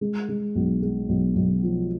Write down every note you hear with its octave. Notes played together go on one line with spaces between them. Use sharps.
G#3
G#3
B1
G#3
B1
B1
F3